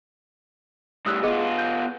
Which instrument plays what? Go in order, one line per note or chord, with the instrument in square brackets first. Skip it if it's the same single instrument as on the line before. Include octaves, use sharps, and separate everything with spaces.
[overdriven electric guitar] A2 G3 [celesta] D#6 E6 F#6
[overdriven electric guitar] B3 F4 [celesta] G#4 D#5 D6
[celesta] G6